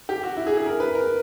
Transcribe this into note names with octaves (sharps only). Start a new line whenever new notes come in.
G4
F#4
E4
G#4
G#4
A#4
B4
A#4